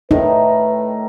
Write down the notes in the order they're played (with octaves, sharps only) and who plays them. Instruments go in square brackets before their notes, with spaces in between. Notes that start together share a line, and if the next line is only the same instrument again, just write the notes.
[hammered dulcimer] A2 D#3 A#4 [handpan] D#4 [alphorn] B4